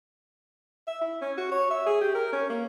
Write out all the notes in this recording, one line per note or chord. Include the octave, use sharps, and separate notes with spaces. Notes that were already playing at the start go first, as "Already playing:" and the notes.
E5
E4
C#4
F#4
C#5
E5
G#4
G4
A#4
C#4
A#3